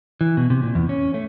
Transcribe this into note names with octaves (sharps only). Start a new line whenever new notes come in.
E3
B2
C3
A#2
E2
C#4
A3